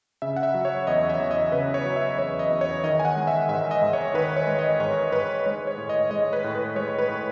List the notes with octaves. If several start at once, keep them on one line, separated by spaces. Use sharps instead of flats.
C#3 E5
F#5
E5
F#3
C#5
E2 D#5
E5
E2
D#5
C#3 B4
C#5
F#3
E5
E2 C#5
D#5
E2
C#5
D#3 D#5
G#5
F#5
G#3
E5
G#2 E5
D#5
G#2
C#5
D#3 B4
C#5
G#3
D#5
G#2 C#5
G#2 B4
G#3 C#5
C#5
A2
D#5
G#3 D#5
B4
A2
B4
G#3 C#5
B4
A2